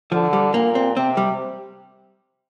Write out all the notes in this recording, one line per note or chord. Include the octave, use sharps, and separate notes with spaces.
D3 F3
G3
A#2 A#3
C4
C3 C4
G3